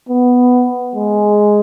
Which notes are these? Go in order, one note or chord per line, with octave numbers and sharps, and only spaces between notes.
B3
G#3